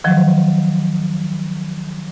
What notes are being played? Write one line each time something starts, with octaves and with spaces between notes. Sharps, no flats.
D#3 F3 F#3